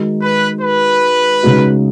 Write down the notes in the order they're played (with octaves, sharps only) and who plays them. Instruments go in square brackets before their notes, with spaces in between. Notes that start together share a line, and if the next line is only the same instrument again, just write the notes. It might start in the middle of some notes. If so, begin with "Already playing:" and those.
Already playing: [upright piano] D#3 G#3 D#4 F#4
[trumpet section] B4
B4
[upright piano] C#3 G#3 D#4 F#4